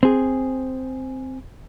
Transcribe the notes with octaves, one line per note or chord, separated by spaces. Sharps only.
C4 G#4